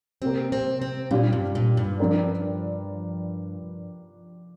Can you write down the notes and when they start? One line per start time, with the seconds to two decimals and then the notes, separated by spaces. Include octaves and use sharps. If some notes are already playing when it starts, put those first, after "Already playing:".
0.22 C3 A#3 C4 G4 A#4
0.52 C4
0.81 C4
1.11 A#2 G3 D4 F4
1.33 G2
1.55 A#2
1.77 G2
1.99 F3 D4 G4 A#4 D5